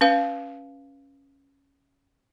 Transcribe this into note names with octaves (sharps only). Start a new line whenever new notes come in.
C#4 B4 F5